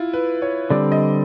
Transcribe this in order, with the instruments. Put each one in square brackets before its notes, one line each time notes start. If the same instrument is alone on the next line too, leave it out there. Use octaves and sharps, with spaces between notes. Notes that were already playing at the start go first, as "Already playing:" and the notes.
Already playing: [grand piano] E4 F4
B4
C#5
[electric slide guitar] D3 G3 C4 [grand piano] D5
[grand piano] D#5